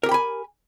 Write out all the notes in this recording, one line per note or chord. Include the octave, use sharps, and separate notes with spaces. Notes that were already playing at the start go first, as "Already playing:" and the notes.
G4 A#4 G5 G#5 B5